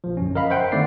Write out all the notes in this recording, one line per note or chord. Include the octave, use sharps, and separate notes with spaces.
A#1 F3
G1 F#2 C#4
A#4 D#5 F5 B5
C5 E5 F#5 G5 C6
D3 D#3 A3 C4 D5 C7